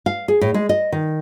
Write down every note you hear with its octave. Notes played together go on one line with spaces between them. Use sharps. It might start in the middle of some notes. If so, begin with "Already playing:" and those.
F5
G#4
A2
G#3
D#5
D#3